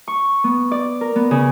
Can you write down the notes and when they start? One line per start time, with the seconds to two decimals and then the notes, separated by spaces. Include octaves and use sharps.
0.08 C#6
0.44 B3
0.71 D5
1.01 A#4
1.16 B3
1.31 C#3